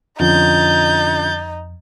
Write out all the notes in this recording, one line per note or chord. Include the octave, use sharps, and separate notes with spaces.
F2 D3 F3 C#4 D#4 G6 A6